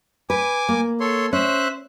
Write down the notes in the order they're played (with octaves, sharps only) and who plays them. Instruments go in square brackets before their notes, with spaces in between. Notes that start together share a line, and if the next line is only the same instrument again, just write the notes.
[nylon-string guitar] B4 [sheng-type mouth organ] G#5 D6
[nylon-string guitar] A#3
[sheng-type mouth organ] A4 C#5 C6
[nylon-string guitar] C#4 [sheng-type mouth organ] C5 E5 F#6